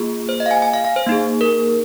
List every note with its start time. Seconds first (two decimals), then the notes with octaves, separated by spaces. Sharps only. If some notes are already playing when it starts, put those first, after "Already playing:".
Already playing: A#3 F4 G#4
0.29 C5
0.40 D#5
0.46 F5
0.51 G#5
0.62 G#5
0.73 F5
0.85 F5
0.96 C5
1.07 A#3 D#4 G#4
1.41 A#4